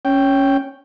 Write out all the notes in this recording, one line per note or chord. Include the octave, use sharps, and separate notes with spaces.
C#4 G5